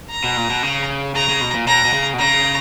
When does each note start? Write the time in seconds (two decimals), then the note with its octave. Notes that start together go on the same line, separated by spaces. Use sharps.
0.10 A#5
0.24 B2
0.37 A#2
0.50 B2
0.63 C#3
1.15 C#3 A#5
1.29 C#3
1.41 B2
1.54 A#2
1.67 B2 A#5
1.85 B2
1.94 C#3
2.14 B2
2.19 C#3 A#5